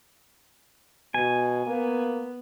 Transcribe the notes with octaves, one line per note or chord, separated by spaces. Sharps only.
B2 G#5
A#3 B3